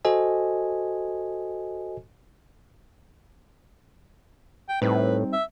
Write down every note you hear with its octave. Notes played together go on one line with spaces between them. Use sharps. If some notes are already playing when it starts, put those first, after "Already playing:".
F#4 A4 C5 D#5 G#5
G5
A2 G3 C4 D#4 B4
E5